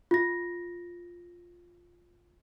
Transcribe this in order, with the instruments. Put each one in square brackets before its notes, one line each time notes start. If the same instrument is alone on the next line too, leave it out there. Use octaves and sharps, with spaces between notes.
[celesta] F4 A#6